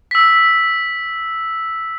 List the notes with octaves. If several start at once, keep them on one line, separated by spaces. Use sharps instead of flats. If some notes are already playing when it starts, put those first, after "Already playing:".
E6 B6